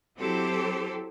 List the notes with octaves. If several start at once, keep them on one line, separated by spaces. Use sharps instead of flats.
F#3 C4 E4 G4 A4 C5